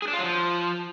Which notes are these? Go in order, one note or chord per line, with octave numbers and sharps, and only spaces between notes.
G#4
D4
F4
F#3
F3